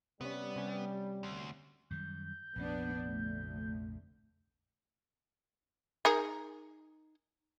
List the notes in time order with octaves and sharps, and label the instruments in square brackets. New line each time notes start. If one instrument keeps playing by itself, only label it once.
[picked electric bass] C3 C#4 [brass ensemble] G3 [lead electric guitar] B3
[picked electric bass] C3 C#4
[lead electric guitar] D2
[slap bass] F#2 D#3 G3 [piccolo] G6
[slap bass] A#1 F2 C3 [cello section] B3 D4
[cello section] D2
[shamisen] D#4 G#4 A#4